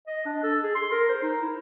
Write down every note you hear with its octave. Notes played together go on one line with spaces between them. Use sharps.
D#5
D4
A4
G#4
C6
A#4
C5
D#4
E4